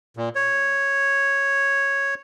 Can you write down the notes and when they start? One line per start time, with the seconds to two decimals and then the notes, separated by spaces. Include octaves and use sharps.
0.17 A#2
0.35 C#5